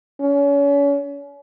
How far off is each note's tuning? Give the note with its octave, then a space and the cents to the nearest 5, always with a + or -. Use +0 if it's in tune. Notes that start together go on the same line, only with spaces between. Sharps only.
C#4 +35